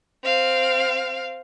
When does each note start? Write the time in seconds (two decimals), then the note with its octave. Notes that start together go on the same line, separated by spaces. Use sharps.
0.24 C4 F5